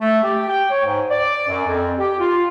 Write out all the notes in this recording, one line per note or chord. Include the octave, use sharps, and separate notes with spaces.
A3
G4
G5
C#5
G#2
D5
F#2
F2
G4
F4